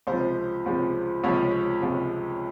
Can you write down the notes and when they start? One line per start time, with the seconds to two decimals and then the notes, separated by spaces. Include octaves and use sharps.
0.07 C#2 C3 F3 C5
0.66 C#2 C3 F3
1.24 C#2 C3 F3 C#5
1.82 C#2 C3 F3